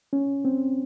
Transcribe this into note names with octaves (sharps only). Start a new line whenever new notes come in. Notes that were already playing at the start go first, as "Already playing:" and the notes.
C#4
C4